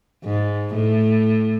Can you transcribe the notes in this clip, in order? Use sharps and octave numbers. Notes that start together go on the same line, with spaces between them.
G#2
A2